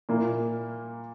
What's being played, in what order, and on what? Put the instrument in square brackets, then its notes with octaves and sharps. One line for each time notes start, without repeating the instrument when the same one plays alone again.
[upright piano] A#2 A#3 E4